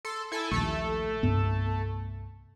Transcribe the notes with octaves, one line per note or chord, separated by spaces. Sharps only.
A4 C6
E4 A4 G#5
A#1 D#2 A3 A4
C2 G2 B3